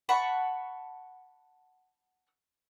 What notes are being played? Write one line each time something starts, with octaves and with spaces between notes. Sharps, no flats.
F#5 A5 B5 C#6